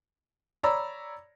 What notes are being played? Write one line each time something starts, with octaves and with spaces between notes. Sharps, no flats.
C#5 D5 A#5 B5 E6